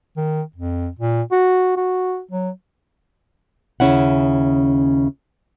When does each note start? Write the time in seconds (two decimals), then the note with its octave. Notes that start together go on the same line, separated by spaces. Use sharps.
0.17 D#3
0.56 F2
0.99 A#2
1.31 F#4
1.77 F#4
2.31 F#3
3.80 D#2 C#3 A3 C#4 E4 F#5